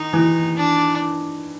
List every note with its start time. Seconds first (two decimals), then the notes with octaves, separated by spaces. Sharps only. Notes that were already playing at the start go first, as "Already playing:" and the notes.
Already playing: D#3 D#4
0.13 E3
0.57 D4